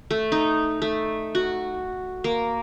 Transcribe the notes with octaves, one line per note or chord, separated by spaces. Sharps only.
A3
D#4
A3
F#4
A#3